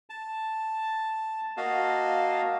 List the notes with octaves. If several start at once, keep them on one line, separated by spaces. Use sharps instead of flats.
A5
A#3 F#4 D#5 F5 A5